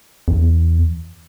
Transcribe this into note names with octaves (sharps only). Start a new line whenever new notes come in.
E2